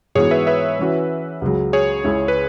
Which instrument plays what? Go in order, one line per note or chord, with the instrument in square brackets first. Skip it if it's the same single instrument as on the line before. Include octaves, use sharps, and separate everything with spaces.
[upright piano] G#2 E3 B3 F#4 [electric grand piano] G#4 C#5
[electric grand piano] B4 E5
B4 E5
[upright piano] E3 C#4 F#4
C#2 C#3 F#3
[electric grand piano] G#4 C#5
[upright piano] C#2 C#3 G#3 E4
[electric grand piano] B4